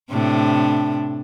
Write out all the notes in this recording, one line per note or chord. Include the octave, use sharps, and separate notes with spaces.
A2 C3 D4